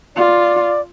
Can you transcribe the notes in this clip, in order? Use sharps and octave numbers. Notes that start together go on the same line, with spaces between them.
F4 D5